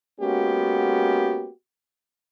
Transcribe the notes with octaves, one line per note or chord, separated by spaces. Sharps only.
G#3 A#3 B3 C#4 F#4 G4